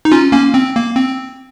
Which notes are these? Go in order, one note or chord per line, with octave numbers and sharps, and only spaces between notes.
D#4
C#4 F4
A#3 C#4
C4
A#3
C4